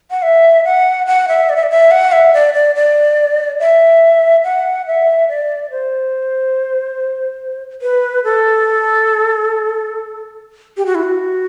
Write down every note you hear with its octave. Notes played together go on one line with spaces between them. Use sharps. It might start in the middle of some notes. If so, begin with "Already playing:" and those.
F#5
E5
F#5
F#5
E5
D5
E5
D5
E5
F#5
E5
D5
D5
D5
E5
F#5
E5
D5
C5
B4
A4
G4
F#4
E4
F#4